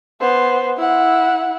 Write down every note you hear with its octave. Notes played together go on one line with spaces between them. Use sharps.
B3 C5
E4 F#5